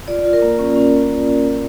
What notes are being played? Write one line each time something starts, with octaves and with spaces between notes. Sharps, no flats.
F4 D5
F4
A#4
A#3
C#4
C#4